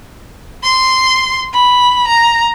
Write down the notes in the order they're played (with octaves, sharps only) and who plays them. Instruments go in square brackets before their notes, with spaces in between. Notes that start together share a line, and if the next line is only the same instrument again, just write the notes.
[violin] C6
B5
A#5